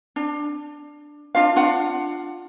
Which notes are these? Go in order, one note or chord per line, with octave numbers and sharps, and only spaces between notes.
D4
D4 F4 F5
D4 F4 F#5